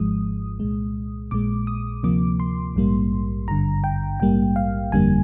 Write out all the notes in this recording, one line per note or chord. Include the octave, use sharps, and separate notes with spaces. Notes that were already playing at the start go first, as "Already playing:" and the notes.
Already playing: G#1 G#2 F3 G#3 D#6
C2 A#2 G#3
A#1 A#2 G#3 D6
D#6
D2 C3 F3 A#3 D6
C6
A#1 G#2 G3 A#3
G#1 G2 D3 A#5
G5
A#1 G#2 G3 A#3 G5
F5
G1 F2 D3 G3 A#3 G#5